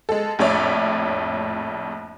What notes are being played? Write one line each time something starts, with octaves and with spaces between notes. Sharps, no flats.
G#3 A4
A#1 F2 A2 C#5 D5 E5